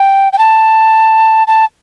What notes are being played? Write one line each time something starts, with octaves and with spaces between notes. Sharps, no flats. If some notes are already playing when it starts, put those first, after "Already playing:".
Already playing: G5
G5
A5
A5